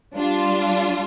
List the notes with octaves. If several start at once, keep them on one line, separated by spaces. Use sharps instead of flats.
G3 D4 F4